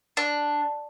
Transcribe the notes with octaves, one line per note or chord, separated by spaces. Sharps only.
D4